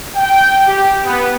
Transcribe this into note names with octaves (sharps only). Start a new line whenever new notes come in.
G5
G4
B3